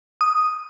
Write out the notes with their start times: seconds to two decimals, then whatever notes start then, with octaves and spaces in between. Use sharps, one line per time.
0.21 D#6